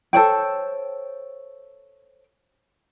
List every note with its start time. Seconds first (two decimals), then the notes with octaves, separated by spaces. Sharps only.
0.13 A4 C5 C#5 G5